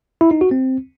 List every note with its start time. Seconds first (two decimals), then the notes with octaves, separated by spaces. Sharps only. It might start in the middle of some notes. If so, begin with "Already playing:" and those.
0.21 E4
0.31 D#4
0.41 F#4
0.51 C4